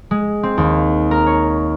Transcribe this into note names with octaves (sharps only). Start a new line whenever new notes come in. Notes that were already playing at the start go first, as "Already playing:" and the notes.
G#3
C4
D#2
A#4
C#5